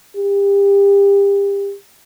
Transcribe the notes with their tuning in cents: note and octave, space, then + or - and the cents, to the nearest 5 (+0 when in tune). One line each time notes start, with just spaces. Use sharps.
G4 +30